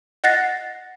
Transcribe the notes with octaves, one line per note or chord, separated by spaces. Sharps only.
D#5 F#5 F#6 A6 A#6 C7